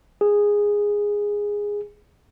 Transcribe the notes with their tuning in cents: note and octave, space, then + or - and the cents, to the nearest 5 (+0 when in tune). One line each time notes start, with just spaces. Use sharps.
G#4 -10